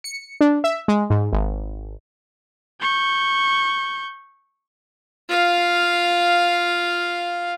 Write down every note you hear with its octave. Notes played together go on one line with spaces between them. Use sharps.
C#7
D4
E5
G#3
G#2
G#1
C#6 G6
F4 F5